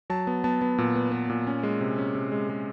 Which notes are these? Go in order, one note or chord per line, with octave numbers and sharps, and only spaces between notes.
F#3 A5
B3
B3 A5
B3
A#2
B3
B3
A#2
C#4
G#3
C3
C#4
C3
G#3
G#3